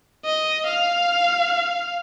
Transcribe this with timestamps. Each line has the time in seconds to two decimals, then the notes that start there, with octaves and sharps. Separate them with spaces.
0.24 D#5
0.65 F5